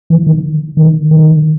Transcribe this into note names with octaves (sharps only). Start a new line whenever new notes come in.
E3
D#3
D#3
D#3